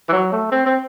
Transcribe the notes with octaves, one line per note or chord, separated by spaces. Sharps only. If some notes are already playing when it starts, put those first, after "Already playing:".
E3
F#3
A3
C4
C4